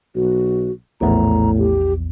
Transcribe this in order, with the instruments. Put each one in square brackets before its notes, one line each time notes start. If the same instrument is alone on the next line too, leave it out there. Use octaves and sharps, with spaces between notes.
[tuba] B1 [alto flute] F#4
[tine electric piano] A#1 E2 [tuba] A2 [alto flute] A#5
[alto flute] G4